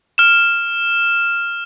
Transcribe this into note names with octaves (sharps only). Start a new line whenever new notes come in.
F6 E7